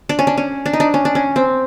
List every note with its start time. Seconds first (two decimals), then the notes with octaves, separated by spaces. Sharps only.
0.09 D4
0.19 C#4
0.27 D4
0.37 C#4
0.66 D4
0.73 D#4
0.80 D4
0.94 C#4
1.05 D4
1.15 C#4
1.36 C4